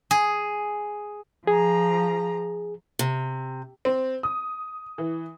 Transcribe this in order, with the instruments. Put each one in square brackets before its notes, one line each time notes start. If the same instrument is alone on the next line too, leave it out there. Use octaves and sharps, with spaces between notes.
[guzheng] G#4
[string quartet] F3 A#5 [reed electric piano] G#4
[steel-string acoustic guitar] C3
[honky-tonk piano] C4
D#6
E3